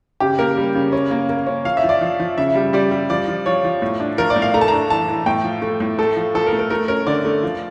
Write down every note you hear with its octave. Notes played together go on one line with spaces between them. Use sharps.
C#3 G4
A#3 A#4
G3
C#3
C#4
A#3
A#3
C#4
F3 F5
E5
F3
D5
F3
F3
C#3 E5
G3
G3 D5
G3
F3 D5
F3
F3 C#5
F3
A2
D4
F3 A#4
D5
A2
F5
A3 A#5
A5
D4 A#5
E3 A5
E3
A2 G5
F3
A3
A2
A3 A4
F3
F3 A4
A#4
A3
A#4
A3 A#4
C#4 A#4
D3 D5
A3
F3